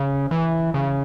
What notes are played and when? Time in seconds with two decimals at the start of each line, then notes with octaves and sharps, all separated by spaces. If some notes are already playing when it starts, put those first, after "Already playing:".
Already playing: C#3
0.31 E3
0.74 C#3